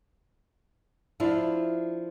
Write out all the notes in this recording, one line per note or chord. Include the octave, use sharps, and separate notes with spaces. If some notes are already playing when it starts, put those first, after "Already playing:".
F3 D4 E4 F4